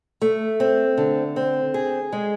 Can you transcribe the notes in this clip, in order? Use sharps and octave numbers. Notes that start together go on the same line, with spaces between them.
A3
C4
D3
C4
G#4
G#3